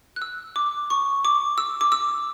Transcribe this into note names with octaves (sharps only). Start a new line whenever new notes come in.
F#6
E6
D6
C#6
D6
E6
D6
E6